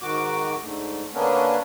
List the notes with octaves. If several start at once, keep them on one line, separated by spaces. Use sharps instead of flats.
G#2 D#3 F#4 D6
G#2 D3 A3
D3 A#3 B3 C#4 D4